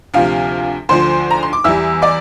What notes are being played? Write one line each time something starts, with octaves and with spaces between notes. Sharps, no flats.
D2 C3 F3 F4 F5
D2 D3 F3 C5 C6
A#5
C6
D6
E2 E3 G3 E5 E6
D5 D6